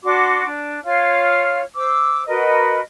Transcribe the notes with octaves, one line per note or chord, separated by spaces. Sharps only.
D4 F#4 C6 D6
D4
F4 C#5 F5 F6
C5 D6 E6
F#4 A#4 B4 D#5